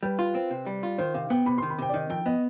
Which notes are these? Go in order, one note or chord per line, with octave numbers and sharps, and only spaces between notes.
G3 B4
F4
C4
C3
G3
F4
D#3 C5
C3 F5
B3 G5
C3 B5
D#3 C6
B5
C3 G5
D5
D#3 D#5
F2 G5
B3 D#5